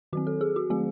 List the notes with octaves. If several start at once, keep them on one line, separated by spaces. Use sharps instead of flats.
D#3 F#3 C4 F#4
A4
G#4
F#4
D#3 F#3 A3 C4 G#4